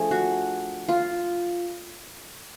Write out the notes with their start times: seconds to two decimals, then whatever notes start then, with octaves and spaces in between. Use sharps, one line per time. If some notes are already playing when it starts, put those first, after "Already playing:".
Already playing: F3 A3 D4 G#4
0.11 F#4
0.89 F4